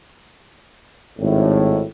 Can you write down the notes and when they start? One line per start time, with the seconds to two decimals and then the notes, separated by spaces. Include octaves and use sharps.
1.18 G#1 A2